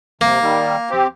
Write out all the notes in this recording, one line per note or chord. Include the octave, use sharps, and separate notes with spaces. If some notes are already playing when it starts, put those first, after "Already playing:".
C3 A#3
D#3 G3
C4 G4